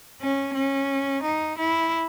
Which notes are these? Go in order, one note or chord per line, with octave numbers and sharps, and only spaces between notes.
C#4
C#4
D#4
E4